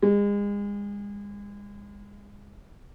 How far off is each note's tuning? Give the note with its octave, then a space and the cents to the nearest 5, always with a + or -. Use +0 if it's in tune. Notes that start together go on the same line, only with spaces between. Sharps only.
G#3 -35